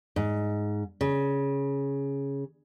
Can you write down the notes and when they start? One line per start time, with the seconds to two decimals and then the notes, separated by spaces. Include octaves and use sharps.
0.16 G#2
1.01 C#3